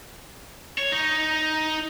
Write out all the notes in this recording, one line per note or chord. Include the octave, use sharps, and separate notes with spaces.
C#5
D#4